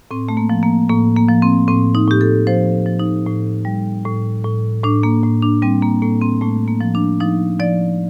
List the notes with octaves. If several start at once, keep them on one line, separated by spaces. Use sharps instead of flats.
A2 C4
A3
A#3
F3
A#3
A2 A#3
A#3
F3
C4
A2 C4
D#4
A2 G4
A4
F3 C5
F3
D#4
A2
G3
A2
A2
A2 D4
A#3
A2
D4
G3 C4
A#3
A2 A#3
C4
A2 A3
A#3
F3
D4
F3 D#4
F3 D5